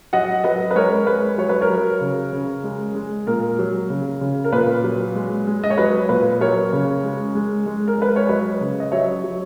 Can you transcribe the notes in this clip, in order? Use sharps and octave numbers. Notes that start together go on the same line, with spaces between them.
F#3 D#5 F#5
F#3 B4 D#5
B4
G#3 A#4 C#5
G#3 B4
F#3 C#5
B4
A#4 C#5
F#3
C#3
C#3
G#3
G#3
A#2 A#4
F#3
C#3
C#3
A#4
A#2 B4
F#3
G#3
G#3
D#5
C#5
F#3 B4
A#2 B4
F#3 A#4 C#5
C#3
G#3
G#3
G#3
A#4
G#3 B4
C#5
F#3 B4 D#5
C#3
D#5
F#3 C#5 E5
F#3